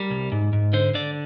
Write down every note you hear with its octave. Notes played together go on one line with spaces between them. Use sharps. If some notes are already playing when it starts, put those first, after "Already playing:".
Already playing: G3 A#4
C2
G#2
G#2
D3 C5
D3 D5